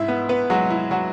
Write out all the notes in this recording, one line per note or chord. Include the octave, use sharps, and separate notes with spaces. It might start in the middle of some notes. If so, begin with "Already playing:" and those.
Already playing: G#2 E4 E5
B3
B3 B4
F#3 G#3 F#4
E4
F#3 F#4